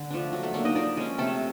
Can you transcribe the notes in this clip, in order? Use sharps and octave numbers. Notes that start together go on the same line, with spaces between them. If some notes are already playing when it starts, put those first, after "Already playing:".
Already playing: D3
F3 A3 D4
F#3
A3 A4
A3 A#3 D4 A4
D#4 D#5
F3 D4 D5
G#3 C#4
C3 A3 A4